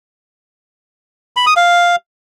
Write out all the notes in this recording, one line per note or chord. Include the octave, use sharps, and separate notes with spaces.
B5
D#6
F5